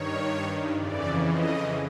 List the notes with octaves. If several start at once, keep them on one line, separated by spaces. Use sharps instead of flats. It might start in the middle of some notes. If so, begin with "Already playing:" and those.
Already playing: G2 D#3 C#5
F2 C#3 E3 D5
D#5